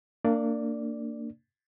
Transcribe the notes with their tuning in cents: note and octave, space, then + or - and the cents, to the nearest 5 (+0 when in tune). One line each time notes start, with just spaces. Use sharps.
A#3 -25 D4 +0 D5 +0